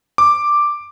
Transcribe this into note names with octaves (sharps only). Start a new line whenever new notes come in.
D6